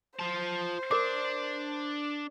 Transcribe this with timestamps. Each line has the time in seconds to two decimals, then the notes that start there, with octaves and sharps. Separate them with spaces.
0.19 F4 C5 A5
0.91 D4 A#4 D6